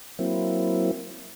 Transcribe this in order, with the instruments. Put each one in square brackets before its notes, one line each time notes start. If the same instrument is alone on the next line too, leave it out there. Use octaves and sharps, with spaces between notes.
[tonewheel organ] F#3 A#3 C4 E4